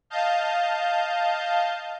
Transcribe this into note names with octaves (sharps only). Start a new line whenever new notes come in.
D#5 F5 A5 G6